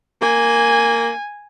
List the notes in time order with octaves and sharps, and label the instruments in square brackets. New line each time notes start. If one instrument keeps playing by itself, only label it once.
[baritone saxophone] A#3 [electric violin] G#5